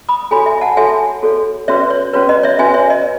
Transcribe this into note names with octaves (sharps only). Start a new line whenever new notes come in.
B5 D#6
F#4 A4 C#5 G#5 B5
E5 G#5
F#5 A5
F#4 A4 C#5 E5 G#5
F#4 A4 C#5
C#4 F#4 B4 C#5 E5
C#5
C#4 F#4 B4 C#5
D#5
C#5 E5
C#4 F#4 B4 E5 G#5
C#5 E5
D#5